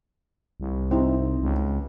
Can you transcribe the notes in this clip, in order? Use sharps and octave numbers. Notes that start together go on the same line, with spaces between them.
C2
C4 D#4 E4
C#2